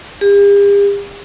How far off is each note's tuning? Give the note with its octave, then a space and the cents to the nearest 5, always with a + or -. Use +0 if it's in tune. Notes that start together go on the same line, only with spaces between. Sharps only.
G4 +45